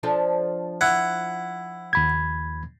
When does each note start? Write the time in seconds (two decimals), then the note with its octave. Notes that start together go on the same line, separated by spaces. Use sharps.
0.03 F3 D4 A4
0.81 E4 F#5
1.93 D#2 B5 G#6